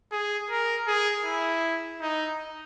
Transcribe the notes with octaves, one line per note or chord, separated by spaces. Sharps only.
G#4
A#4
G#4
E4
D#4